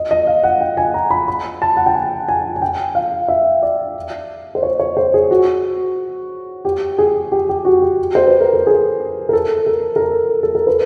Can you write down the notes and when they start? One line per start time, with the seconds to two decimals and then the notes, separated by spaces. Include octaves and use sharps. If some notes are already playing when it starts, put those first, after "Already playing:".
Already playing: D#5
0.11 D#5
0.27 F5
0.43 F#5
0.61 G5
0.77 G#5
0.94 A#5
1.11 B5
1.28 B5
1.62 A5
1.77 F#5
1.86 G5
1.95 G#5
2.28 G#5
2.56 G#5
2.62 G5
2.95 F5
3.28 E5
3.63 D5
4.55 C5
4.63 C#5
4.80 C#5
4.97 C5
5.14 G#4
5.31 F#4
6.65 G4
6.98 G#4
7.32 G4
7.49 G4
7.65 F#4
7.82 G4
8.15 C5
8.27 B4
8.41 A#4
8.53 A4
8.67 G#4
9.29 A#4
9.33 A4
9.66 A#4
9.96 A#4
10.00 A4
10.43 A4
10.55 A#4
10.67 B4